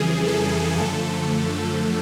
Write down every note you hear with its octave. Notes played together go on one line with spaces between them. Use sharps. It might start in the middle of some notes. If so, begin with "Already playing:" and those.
Already playing: F2 C#3 E3 G3 G#4
A4
F#2 D3 F3 A3 A4